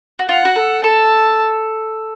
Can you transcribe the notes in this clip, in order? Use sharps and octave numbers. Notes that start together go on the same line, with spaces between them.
F#4
F4 F#5
F#4
A4
A4 A5